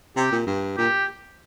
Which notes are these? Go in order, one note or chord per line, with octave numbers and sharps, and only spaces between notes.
C3 G4
A#2
G2
A#2 G4